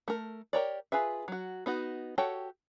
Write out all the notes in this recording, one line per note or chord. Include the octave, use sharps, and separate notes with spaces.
A3 A#4
G4 A#4 C#5 D5
F4 G#4 B4 E5
F#3 F#4
B3 D#4 F#4
F#4 G4 A4 C#5 G5